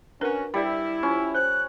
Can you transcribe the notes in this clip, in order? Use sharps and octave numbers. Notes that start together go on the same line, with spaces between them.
C#4 D4 F#4 A#4 B4
G3 E4 D5 B5
C#4 F4
C5 F#6